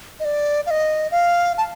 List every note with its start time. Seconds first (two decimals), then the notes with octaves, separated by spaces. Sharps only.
0.20 D#5
0.25 D5
0.66 F5
0.71 D#5
1.12 F5
1.58 A5